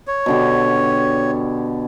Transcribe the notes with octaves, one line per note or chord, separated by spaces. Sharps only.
C#5
B2 D3 G4